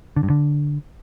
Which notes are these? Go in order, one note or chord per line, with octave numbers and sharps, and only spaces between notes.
D3
G2
D3